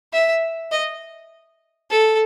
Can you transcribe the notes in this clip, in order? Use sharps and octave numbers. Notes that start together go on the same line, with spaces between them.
E5
D#5
A4